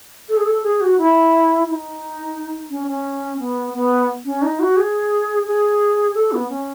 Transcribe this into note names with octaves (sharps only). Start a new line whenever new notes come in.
A4
G#4
A4
G#4
F#4
E4
E4
D#4
C#4
C#4
B3
B3
C#4
D#4
F#4
G#4
G#4
A4
B3
C#4